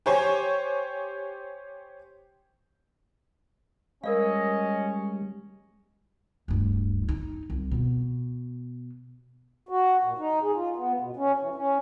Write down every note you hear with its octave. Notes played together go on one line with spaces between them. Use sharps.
G4 C5 C#5 G#5
G3 G#3 C#4 A#4 D5 D#5 F5
D1 G2
D#4
C2
B2
F#4
A#2
D#4
G#4
F4
B3
B2
C#4
E3
C#4